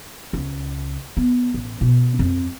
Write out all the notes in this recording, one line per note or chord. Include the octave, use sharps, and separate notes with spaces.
C#2
B3
A1
B2
F2